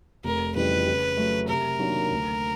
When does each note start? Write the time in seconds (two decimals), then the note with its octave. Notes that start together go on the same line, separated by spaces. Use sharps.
0.24 F1 A#4
0.55 F2 C#3 E3 G3 B4
0.87 C#3
1.17 F#3 A3
1.48 C3 A#4
1.79 D#3 F#3 A#3 D4
2.11 D2